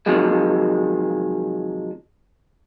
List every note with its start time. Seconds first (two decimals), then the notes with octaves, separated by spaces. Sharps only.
0.06 C3 D#3 F3 F#3 G#3